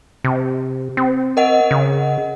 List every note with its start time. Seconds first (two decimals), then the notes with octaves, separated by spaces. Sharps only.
0.24 C3
0.97 C4
1.37 A#4 D#5 F#5
1.71 C#3